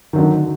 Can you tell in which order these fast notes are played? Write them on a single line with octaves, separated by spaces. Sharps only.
D#3 F#3 D3